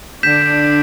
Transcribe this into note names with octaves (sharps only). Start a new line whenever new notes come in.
D3 D4 G6 B6 E7